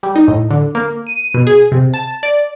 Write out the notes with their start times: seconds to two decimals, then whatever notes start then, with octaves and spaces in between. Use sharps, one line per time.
0.03 G3
0.16 D#4
0.28 A2
0.51 D3
0.75 A#3
1.07 D#7
1.34 B2
1.47 G#4
1.72 C3
1.94 A5
2.23 D5